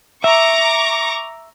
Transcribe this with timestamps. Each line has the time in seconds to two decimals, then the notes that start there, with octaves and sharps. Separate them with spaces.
0.24 E5 A#5 C#6 D6